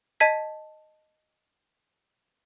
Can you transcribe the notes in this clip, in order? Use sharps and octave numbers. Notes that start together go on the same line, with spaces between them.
D#5 A5 G#6 B6